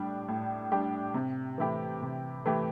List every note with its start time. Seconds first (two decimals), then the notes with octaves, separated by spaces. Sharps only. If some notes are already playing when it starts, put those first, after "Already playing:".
Already playing: A2 G3 D4 G4
0.28 A2
0.72 G3 D4 G4
1.14 C3
1.58 E3 A3 E4 G4
2.02 C3
2.45 E3 A3 E4 G4